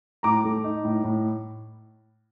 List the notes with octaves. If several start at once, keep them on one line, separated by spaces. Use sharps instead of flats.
A2 A#5 D6
A3
D#4
A2
A2